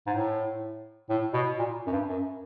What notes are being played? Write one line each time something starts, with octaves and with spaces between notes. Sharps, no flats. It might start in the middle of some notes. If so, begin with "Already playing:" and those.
G#2
A2
A2
B2
A#2
F#2
G2
F#2